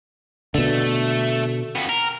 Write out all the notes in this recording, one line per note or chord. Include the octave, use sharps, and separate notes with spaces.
B2 D3 A3
F2 B3
A#4